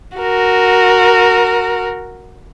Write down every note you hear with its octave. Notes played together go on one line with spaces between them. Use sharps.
F#4 A#4